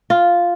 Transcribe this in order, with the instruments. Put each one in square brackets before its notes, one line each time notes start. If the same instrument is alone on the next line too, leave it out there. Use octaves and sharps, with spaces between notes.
[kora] F4